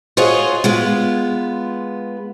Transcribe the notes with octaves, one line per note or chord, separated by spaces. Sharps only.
F4 F#4 G#4 C5 C#5 D#5
G#3 B3 F4